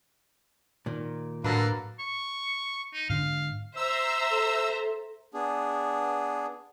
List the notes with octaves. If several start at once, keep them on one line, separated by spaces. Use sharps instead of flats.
A#2 D#3
A2 D3 F#3 A#3 B4 A#5
C#6
D#4
G#2 D3 D4 F5
C5 E5 A#5 E6
A4
B3 D4 G#4